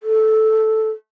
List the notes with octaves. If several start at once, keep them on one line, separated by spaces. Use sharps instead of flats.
A4